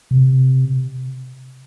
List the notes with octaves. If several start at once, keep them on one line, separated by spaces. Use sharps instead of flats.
C3